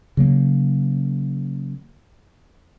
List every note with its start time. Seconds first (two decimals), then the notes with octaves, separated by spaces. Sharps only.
0.17 C#3 F#3 A#3